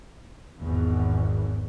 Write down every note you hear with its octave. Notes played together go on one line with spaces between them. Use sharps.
G#1 E2 G#2 B2